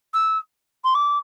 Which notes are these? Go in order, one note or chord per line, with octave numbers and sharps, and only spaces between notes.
E6
C6
D6